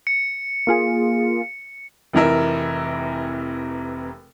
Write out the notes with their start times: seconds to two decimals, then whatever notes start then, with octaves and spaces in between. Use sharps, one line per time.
0.07 C#7
0.67 A#3 F4 G#4
2.13 F1 C3 E3 A#4 E5